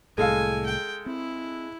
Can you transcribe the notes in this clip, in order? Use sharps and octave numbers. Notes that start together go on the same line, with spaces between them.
C2 A2 G#3 A4 F5 G#5
G5
C4 E4